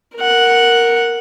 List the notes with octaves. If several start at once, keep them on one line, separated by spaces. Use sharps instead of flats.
A#4 F#5